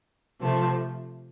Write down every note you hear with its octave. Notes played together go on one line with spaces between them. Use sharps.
C3 F3 A3